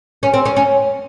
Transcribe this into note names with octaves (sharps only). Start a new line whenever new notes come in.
C#4
C4
C#4
C#4